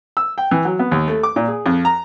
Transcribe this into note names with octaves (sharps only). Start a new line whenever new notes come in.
E6
G5
E3
F#3
B3
D#2
A3
D6
A#2
G#4
F2
A#5